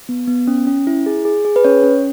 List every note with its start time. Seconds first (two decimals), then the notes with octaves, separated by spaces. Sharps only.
0.09 B3
0.28 B3
0.47 C#4
0.67 C#4
0.87 E4
1.06 G#4
1.25 G#4
1.45 G#4
1.56 B4
1.64 C#4 C#5
1.84 C#4